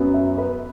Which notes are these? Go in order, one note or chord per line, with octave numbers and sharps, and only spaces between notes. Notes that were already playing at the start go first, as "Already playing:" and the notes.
Already playing: F#2 F#3 B3
E5
B4